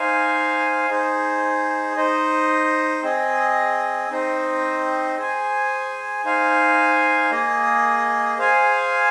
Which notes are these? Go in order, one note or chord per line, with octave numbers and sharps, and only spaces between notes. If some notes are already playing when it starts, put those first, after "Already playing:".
Already playing: D#4 C5 F5 G#5
D#4 G#4 C5
D#4 C5 D#5
C4 G#4 D#5
C4 D#4 C5 D#5
G#4 C5 G#5
D#4 C5 F5 G#5
A#3 G#4 D#5
G#4 C5 F5 G#5